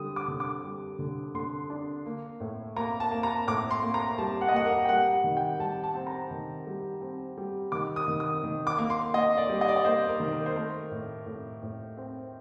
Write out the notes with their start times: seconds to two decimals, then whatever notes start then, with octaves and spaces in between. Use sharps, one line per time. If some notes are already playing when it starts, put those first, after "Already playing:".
Already playing: D3 G3 D#6
0.16 D6
0.28 D3
0.40 D6
0.64 G3
0.99 D3
1.34 D3 C6
1.70 D4
2.06 A#3
2.40 A2
2.76 A#3 A#5
3.00 A5
3.11 A#3
3.23 A#5
3.47 A2 D6
3.71 C6
3.82 A#3
3.94 A#5
4.18 G3 A5
4.41 F#5
4.48 D#5
4.53 A#3 F#5
4.65 A#4
4.85 G5
4.89 G3 F#5
5.13 F#5
5.24 D#3
5.37 G5
5.59 G3 A5
5.84 A5
5.95 C4
6.07 A#5
6.31 D#3
6.67 G3
7.01 C4
7.38 G3
7.72 D#3 D6
7.96 D#6
8.08 D#3
8.20 D#6
8.44 D#3
8.67 D6
8.78 A#3
8.90 C6
9.14 A#3 D#5
9.38 D5
9.49 G3
9.61 D#5
9.68 D5
9.76 D#5
9.85 A#3 C5
10.09 A#4
10.20 D#3
10.33 A#4
10.46 C5
10.56 A3 A#4
10.91 A2
11.26 A2
11.63 A2
11.97 C4